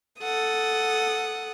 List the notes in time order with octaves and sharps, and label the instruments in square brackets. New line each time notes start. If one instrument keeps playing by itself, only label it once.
[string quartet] A4 F#5 D#6